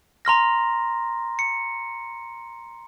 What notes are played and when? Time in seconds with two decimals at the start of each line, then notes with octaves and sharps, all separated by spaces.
0.25 A#5 C6 F6 A#6
1.39 C#7